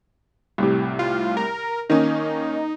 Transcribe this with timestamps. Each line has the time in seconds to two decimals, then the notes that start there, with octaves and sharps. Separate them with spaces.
0.58 C2 A2 C3
0.99 F4
1.37 A#4
1.90 D#3 A#3 C#4 D#4